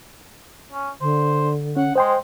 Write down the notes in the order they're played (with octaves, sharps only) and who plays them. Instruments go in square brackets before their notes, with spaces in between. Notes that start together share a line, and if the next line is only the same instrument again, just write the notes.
[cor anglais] C#4
[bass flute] D3 [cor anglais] C5
[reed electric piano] C#4 [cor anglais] F#5
[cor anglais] G#3 [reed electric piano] C5 G5 C6